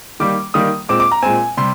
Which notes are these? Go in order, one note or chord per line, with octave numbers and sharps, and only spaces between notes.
D#3 G3 A#3 D6
D#3 G3 A#3 D#6
A#2 G#3 C4 D6
D6
A#5
A#2 G#3 C4 G#5
C3 G3 C6